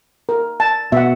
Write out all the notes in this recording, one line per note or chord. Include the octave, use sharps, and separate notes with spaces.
A#4
A5
B2 E5 F#5